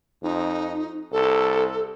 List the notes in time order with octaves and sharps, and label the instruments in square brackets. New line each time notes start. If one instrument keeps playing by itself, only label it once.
[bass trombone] F2 [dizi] D#4
[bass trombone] C2 [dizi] A4